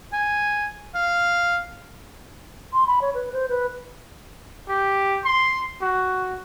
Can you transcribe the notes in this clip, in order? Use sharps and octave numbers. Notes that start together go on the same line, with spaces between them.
G#5
F5
C6
B5
C#5
B4
C5
B4
G4
C6
F#4